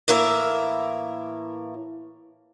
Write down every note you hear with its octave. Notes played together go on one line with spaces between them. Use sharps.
A2 E3 A#3 A#4 E5